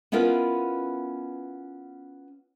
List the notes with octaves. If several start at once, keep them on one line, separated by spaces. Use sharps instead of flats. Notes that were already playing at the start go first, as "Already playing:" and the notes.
B3 C#4 E4 F4 A#4 B4